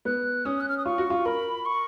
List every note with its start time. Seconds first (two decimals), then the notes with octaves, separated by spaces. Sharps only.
0.05 B3 F#6
0.45 C#4 D#6
0.61 F#6
0.69 F6
0.78 D#6
0.85 F4 C#6
0.98 F#4
1.10 F4
1.26 A#4 B5
1.65 C#6